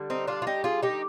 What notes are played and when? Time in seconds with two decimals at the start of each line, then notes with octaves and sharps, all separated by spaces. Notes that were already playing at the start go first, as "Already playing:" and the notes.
Already playing: D3 G3
0.10 C4 D#4
0.27 D4 F4
0.42 F4
0.47 D#4 G4
0.64 F4 G#4
0.83 D#4 G4